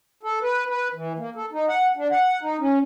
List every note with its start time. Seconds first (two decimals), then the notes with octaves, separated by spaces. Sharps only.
0.23 A4
0.42 B4
0.69 B4
0.94 E3
1.19 A#3
1.36 A4
1.52 D#4
1.69 F#5
1.96 D4
2.11 F#5
2.41 D#4
2.59 C#4